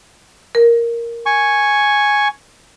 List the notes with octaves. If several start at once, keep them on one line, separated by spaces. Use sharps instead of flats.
A#4
G#5 C#6